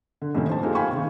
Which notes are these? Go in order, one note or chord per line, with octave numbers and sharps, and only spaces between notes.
D3
F2 A2 C3 D#3 A#3 C#4
C5 A5
G#3 A#3 D#4 F4 G4 A4
F5 G5 G#5 B5 C#6
C3 D#3